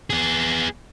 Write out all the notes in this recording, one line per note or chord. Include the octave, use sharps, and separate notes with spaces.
B3 G#4